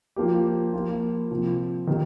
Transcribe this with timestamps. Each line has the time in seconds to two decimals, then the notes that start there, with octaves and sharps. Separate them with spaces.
0.16 F3 A#3 G4
0.73 F3 A#3 F4
1.31 C3 F3 C4
1.87 D#3 A#3 G4